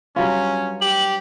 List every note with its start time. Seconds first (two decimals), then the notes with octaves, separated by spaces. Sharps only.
0.16 G2 F#3 C#4 F4
0.81 G4 F#7